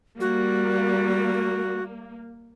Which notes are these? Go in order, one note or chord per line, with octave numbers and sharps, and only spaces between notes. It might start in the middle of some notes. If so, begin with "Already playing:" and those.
G3 A#3 F#4